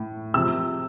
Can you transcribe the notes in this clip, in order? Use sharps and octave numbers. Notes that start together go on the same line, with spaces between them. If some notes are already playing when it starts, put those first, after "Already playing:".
Already playing: A2
C3 F3 E6